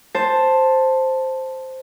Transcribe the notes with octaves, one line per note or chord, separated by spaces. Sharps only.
C5 A5